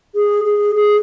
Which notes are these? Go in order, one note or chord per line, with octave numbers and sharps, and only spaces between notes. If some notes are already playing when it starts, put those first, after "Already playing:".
G#4
G#4
G#4